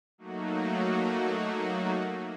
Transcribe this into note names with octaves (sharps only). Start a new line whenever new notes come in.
F#3 A3 A#3 D#4 F#4